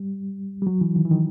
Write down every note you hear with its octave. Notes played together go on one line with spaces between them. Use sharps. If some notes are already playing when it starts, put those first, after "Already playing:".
Already playing: G3
G3
F#3
E3
D#3
E3
D#3